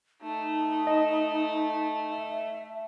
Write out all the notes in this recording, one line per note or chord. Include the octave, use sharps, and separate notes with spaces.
A3 D#4
D#5
E5